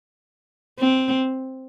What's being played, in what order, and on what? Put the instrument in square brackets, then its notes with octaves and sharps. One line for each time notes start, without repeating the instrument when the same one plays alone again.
[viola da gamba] C4